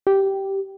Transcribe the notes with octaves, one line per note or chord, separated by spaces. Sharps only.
G4